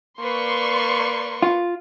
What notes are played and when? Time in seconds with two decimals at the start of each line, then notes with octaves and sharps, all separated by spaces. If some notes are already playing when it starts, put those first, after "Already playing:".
0.20 A#3 B4 D5 C6 C#6
1.42 F4